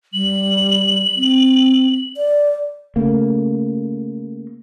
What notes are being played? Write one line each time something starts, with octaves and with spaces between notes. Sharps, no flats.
G3 F#7
C4
D5
C#3 A3 A#3